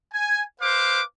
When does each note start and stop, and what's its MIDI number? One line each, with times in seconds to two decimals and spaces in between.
0.12 0.42 80
0.60 1.01 71
0.60 1.01 72
0.60 1.01 77
0.60 1.01 86